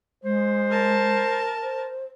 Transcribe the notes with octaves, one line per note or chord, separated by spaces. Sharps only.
G#3 C5
A#4 A5
C5